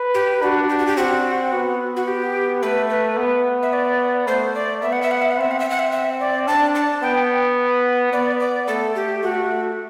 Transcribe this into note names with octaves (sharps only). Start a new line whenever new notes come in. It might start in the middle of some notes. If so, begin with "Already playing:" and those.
Already playing: B4
G4
D4 F#4
G4
F#4
G4
C4 F#4
B3
F#4
G4
A3 B4
B4
B3
E5
D5
A3 C5
D5
B3 E5
F#5
E5
F#5
E5
F#5
C4 E5
F#5
E5
F#5
E5
E5
D5
D4 A5
A5
B3 G5
B3 D5
D5
A3 A4
G4
A3 F#4